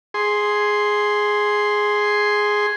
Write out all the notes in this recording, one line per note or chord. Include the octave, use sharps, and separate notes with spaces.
G#4 C6